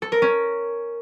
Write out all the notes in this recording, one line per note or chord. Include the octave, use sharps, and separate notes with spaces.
A4
A#4
C#4